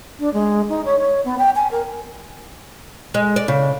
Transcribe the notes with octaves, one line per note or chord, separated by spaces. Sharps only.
D4
G#3
D#4
C#5
C#5
B3
G5
G#5
A#4
G#3
D5
C#3